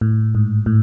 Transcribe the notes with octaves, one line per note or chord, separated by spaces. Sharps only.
A2
G#2
A2